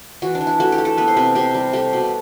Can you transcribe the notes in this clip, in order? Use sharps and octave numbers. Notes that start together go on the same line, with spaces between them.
E3 F#4
D4
E3
E4
A3 F#4
G4
A3
A4
B3 B4
C5
C3 B4
C3 G4
G3
A3 G4
B2